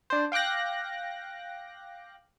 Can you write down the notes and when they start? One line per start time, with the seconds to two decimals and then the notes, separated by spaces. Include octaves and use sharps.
0.10 D4 C5
0.32 F5 G5 D6 F#6 A#6